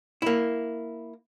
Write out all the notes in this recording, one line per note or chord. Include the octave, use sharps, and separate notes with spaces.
A#3 E4